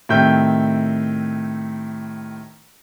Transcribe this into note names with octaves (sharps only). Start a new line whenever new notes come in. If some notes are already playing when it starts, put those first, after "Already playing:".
A2 C3 D#3 E5 G5 G6